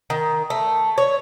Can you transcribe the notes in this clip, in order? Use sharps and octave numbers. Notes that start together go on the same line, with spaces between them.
D#3
A3
C#5